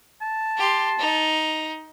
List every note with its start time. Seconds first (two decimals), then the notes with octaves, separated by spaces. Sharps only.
0.22 A5
0.57 G4 C6
0.99 D#4